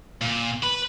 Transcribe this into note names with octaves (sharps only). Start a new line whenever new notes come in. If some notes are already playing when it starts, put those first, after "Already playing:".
A#2
B4